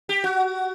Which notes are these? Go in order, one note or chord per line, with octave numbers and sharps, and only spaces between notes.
G4
F#4